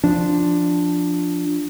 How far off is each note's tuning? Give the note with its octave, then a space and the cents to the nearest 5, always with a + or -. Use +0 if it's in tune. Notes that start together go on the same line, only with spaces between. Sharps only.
F3 +0 D4 +0